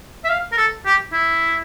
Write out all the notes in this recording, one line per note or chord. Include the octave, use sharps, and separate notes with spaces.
E5
F5
A#4
A4
G4
E4